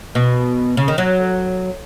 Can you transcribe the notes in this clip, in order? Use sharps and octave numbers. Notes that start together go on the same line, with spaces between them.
B2
C#3
D#3
F#3